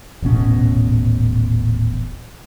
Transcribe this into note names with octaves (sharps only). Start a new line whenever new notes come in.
D#1 A1 B2 C#4